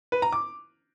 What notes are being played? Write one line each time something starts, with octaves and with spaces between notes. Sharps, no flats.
B4
A#5
D6